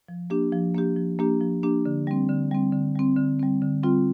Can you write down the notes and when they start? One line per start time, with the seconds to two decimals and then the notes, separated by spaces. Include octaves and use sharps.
0.08 F3
0.30 A#3 D4 G4
0.53 F3
0.74 A#3 D4 G4
0.96 F3
1.19 A#3 D4 G4
1.41 F3
1.63 A#3 D4 G4
1.86 D3
2.07 G3 C4
2.29 D3
2.51 G3 C4
2.73 D3
2.95 G3 C4
3.17 D3
3.39 G3 C4
3.62 D3
3.83 G3 C4 F4